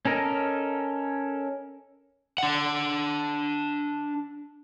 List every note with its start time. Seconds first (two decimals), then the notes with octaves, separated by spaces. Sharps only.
0.05 C#4 A4 A#4 D#5
2.38 D4 F#5